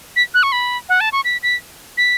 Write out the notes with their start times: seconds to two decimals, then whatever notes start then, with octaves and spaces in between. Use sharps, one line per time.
0.16 B6
0.34 F#6
0.43 C#6
0.52 B5
0.89 F#5
1.01 A5
1.12 C#6
1.25 B6
1.43 B6
1.98 B6